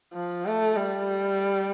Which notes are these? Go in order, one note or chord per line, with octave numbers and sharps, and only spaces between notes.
F3
A3
G3